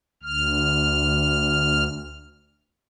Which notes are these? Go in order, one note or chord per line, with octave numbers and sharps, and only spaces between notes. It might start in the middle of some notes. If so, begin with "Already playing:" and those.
D2 F6